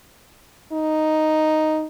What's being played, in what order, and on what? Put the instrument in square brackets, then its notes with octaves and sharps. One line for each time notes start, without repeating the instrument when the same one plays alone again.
[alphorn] D#4